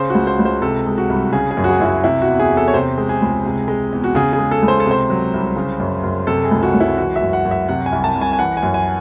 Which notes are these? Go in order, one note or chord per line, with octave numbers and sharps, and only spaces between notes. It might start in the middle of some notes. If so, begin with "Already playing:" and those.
Already playing: C#3 C5
C#2 F#4
C5
C#2
C5
C3 A4
G#3
F#4
C2
C#3 G#4
G#4
F#2
F#4
G#4
F#2 E4
F#4
C3 E4
F#4
E2
G#4
E2
A4
C#5
C3 C5
G#3
G#4
C#2
C3
G#3
E2
F#4
C#3 G#4
G#4
G#3
A4
C#2
C5
A4
C3 C5
F#3
C2
C#3
F#2
F#2
C3 A4
G#4
C#2
F#4
C#2
E4
E3 F#4
E5
F#2
F#5
F#2
E5
C3 F#5
G#5
C2
A5
C2
G#5
G#5
E3 F#5
G#5
F#2
G#5